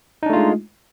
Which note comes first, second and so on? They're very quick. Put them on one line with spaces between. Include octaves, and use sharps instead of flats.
D#4 D4 A3 F4 G#3